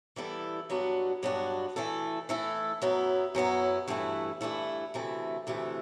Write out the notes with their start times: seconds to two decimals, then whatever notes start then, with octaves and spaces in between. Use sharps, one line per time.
0.16 E3 G3 B3 E4 A4
0.69 G2 F#3 B3 D4 F#4
1.23 G2 F#3 B3 D4 F#4
1.76 E3 A3 E4 A4
2.29 E3 A3 E4 A4
2.82 F#2 F#3 B3 E4
3.35 F#2 F#3 B3 E4
3.88 G2 E3 A3 E4
4.41 G2 E3 A3 E4
4.94 D2 C3 E3 A3 E4
5.47 D2 C3 E3 A3 E4